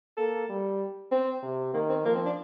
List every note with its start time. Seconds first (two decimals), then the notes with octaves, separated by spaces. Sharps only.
0.17 A#3 A4
0.49 G3
1.12 C4
1.43 C3
1.74 D#3 A#3
1.89 C4
2.05 F3 A#3
2.15 C4
2.25 D4